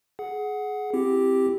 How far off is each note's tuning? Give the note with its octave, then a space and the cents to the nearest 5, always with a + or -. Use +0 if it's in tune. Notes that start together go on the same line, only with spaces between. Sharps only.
G#4 +20 F#5 +0
C4 +0 E4 +30 G4 +0